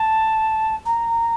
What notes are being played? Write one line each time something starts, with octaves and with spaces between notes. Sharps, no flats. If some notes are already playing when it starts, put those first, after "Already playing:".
Already playing: A5
A#5